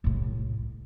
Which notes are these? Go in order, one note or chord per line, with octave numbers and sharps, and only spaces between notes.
C2 A2